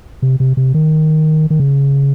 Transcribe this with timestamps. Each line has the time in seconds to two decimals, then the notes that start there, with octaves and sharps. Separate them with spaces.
0.22 C3
0.40 C3
0.57 C3
0.74 D#3
1.50 D#3
1.60 C#3